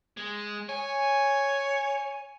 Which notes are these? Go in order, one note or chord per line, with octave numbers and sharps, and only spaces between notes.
G#3
C#5 G#5